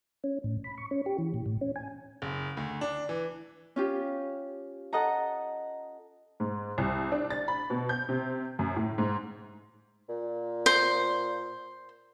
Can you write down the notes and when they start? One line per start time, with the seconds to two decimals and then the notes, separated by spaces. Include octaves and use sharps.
0.24 C#4
0.44 A2
0.64 B5
0.78 C#6
0.91 C#4
1.06 G4
1.18 E3
1.34 A#2
1.46 A2
1.61 C#4
1.76 G#5
2.22 F#1
2.57 D2
2.81 D4
3.09 E3
3.76 C#4 F4 G4
4.93 A4 D#5 F#5 A#5
6.40 G#2
6.78 C2
7.12 D4
7.30 A6
7.48 B5
7.70 B2
7.89 G6
8.09 C3
8.59 F#2
8.76 A2
8.98 G#2
10.09 A#2
10.66 C5